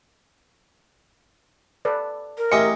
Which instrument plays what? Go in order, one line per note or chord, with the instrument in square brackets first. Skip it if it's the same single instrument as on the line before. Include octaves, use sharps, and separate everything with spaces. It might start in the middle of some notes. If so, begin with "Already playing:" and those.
[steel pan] A4 B4 D5
[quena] A#4
[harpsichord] A1 G4 G#4 [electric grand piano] D#5 C#7 [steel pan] E5 G#5 C6